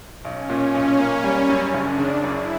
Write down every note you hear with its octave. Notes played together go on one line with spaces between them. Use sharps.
B1 C#4
A#2
B1
A#3
G3
F#2
F#1 D4
C#3
F#2 E4